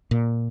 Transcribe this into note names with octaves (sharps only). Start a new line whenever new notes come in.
A#2